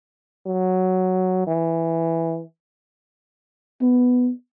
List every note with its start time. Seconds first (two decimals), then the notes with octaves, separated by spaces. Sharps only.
0.47 F#3
1.47 E3
3.82 B3